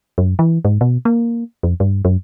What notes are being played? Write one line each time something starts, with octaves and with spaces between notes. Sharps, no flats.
F#2
E3
G#2
B2
A#3
F2
G2
F#2